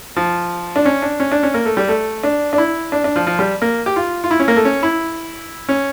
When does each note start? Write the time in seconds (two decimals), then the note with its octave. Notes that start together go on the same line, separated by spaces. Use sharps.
0.16 F3
0.76 D4
0.85 C#4
1.02 D4
1.20 C#4
1.32 D4
1.43 C#4
1.54 A#3
1.65 A3
1.77 G3
1.89 A3
2.23 D4
2.53 D4
2.58 E4
2.92 D4
3.04 D4
3.16 F3
3.27 F3
3.39 G3
3.62 A#3
3.86 G4
3.96 F4
4.24 F4
4.31 E4
4.39 C#4
4.48 A#3
4.57 A3
4.65 C#4
4.83 E4
5.69 C#4